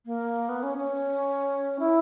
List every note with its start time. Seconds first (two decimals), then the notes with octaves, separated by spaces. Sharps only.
0.06 A#3
0.49 B3
0.63 C#4
0.78 C#4
1.79 E4